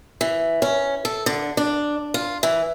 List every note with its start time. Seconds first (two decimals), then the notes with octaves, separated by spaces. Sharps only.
0.21 E3
0.62 C#4
1.05 A4
1.26 D3
1.57 D4
2.14 F4
2.43 E3